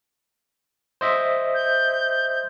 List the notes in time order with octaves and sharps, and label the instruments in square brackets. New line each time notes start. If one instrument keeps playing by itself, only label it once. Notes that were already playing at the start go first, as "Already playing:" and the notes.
[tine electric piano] C5 D#5 E5
[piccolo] G6